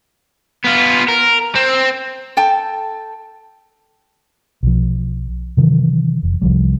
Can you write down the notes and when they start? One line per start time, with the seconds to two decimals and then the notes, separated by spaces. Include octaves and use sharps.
0.65 B3 F4
1.09 A#4
1.55 C4
2.37 A4 G5 A5
4.63 B1 F3
5.57 C3 D#3 E3 F#3
6.23 F1
6.42 C2 F3 G3